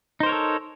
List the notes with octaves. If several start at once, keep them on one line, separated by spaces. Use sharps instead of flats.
D#4 A4 A#4 C5 C#5